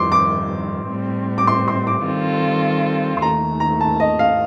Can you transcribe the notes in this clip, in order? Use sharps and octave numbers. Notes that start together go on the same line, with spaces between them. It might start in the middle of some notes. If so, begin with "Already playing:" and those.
Already playing: F2 D#3 G3 C6 D6
D6
A2 G3 C4
D6
C6
C6
D6
D#3 G3 C4 F4 A4
C6
D#2 D#3 A3 A#5
A#5
A5
D#5
F5